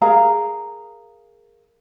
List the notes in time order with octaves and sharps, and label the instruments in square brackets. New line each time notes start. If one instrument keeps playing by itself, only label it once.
[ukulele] G#4 A#4 F5 A#5